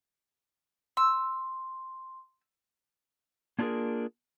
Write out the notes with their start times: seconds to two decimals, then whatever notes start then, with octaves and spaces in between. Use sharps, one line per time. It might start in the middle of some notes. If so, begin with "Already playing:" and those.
0.97 C6 E6
3.59 A#3 D4 F4 F#4 G#4 A#4